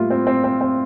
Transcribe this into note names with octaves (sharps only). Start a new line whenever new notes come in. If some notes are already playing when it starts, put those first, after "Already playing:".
Already playing: A2 G3 A#3 E4 F4
C4
C4
C4
C4